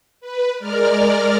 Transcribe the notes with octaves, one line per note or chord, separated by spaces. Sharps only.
B4
G#3 A#4 D5 F6